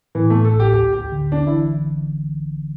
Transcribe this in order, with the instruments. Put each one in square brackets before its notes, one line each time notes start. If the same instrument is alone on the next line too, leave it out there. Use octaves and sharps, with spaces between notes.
[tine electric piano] A2 [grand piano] E3
[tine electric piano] A2 [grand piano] A3
[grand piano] A4
[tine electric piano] A1 [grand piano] G4
[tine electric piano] D2 [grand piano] G4
[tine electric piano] D2 [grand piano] G4
[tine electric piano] D3
[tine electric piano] A1 [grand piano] D4
[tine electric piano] E3 [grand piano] E4